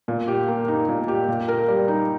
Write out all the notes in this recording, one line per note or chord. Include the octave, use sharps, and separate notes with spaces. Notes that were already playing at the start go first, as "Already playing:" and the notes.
A#2
G4
A#3
D#4
A#2
G4
A#2
A#4
G3
D#4